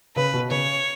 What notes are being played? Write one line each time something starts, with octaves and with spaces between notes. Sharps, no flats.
C#3 B4
B2
C#3 C#5